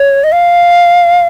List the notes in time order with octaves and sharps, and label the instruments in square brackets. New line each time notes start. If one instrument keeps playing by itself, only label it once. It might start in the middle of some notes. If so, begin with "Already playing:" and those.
Already playing: [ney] C#5
D#5
F5